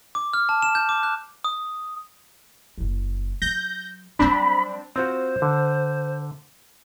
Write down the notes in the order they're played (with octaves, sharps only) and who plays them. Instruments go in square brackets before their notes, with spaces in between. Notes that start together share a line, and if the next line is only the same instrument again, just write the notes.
[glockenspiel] D6
F6
A5
E7
G6
D6
F#6
D#6
[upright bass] F#1 E4
[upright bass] F#3 [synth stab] G6 A#6
[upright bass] F#3 G3 [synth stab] C4 D4 [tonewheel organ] B5
[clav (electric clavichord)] C4 F4 F#4 [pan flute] C5
[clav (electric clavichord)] D3